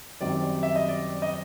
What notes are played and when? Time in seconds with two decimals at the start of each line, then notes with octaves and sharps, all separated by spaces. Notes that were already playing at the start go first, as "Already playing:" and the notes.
0.21 F#2 D#3 G3 C4 D5
0.63 E5
0.76 D#5
0.88 D5
1.22 D#5